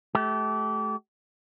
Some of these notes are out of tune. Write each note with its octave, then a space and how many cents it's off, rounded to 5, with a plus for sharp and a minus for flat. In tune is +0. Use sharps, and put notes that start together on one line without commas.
A3 -30 G4 -30